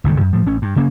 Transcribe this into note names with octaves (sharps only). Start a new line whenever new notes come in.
G1 C#2 A#2 D#3
F#2
A2 F3
A1 C#4
G2
C#3 A#3 C#4